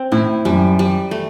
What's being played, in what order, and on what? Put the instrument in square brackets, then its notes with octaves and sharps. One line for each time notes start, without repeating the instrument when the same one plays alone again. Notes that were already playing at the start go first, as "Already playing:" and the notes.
Already playing: [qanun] C4
[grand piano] A2 [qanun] E4
[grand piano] F#2 [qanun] G3
[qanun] G3
A3